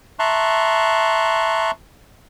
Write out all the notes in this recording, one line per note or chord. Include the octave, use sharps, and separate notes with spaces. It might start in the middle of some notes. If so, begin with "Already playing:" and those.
E5 A5 A#5 C6 C#6 F#6